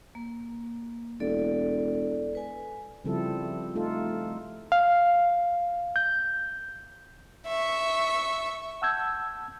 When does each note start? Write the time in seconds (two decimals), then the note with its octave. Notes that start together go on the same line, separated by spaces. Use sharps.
0.15 A#3
1.20 E1 A4 D5
2.35 B4 G#5
3.04 C#3 F3 G3 C4 E4 A4
3.75 A3 D#4 F4 A4
4.72 F5
5.96 G6
7.47 E5 C#6
8.82 F#5 A5 E6 G6 G#6